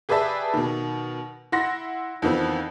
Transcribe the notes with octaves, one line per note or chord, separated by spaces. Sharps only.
G4 G#4 B4 D5 E5 A5
B2 D#3
E4 F#5 C6 A#6
F2 D#3 E3 B3 C4